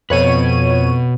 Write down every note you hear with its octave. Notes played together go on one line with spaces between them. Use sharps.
F2 B2 B4 C#5 D#7